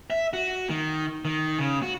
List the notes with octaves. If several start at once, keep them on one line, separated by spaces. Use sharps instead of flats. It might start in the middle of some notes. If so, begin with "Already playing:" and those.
E5
F#4
D#3
D#3
C#3
F#4